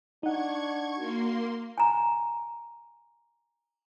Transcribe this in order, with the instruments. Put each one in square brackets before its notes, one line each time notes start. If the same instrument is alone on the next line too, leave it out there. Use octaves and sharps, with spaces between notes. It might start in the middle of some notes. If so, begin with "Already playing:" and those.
[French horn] D4 [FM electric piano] D#4 F#5 [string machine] C#6 G#6
[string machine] A#3 C6 [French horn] F#4
[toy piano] G#5 A#5